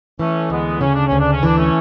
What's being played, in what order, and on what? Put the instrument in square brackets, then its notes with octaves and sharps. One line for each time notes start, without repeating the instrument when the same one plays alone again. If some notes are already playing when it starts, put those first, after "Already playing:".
[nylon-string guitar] E3 [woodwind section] A3 C#4
[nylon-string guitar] D2 [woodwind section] G#3 B3
[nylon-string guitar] C#3 [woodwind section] C#4
[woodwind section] D4
C#4
[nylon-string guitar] D2
[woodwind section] D4
C#4
[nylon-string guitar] E3 [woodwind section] D4
[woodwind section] A3 C#4